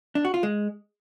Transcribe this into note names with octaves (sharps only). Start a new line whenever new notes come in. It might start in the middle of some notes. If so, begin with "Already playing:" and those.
D4
F#4
F4
G#3